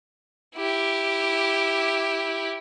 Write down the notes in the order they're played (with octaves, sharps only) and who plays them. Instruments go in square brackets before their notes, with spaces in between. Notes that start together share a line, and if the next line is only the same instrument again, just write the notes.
[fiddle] E4 G4